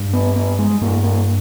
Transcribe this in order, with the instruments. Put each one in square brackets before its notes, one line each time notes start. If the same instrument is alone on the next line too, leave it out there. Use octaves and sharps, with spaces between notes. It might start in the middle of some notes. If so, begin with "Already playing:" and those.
Already playing: [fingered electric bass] G2
B3
B3
G#3
G2 A#3
A#3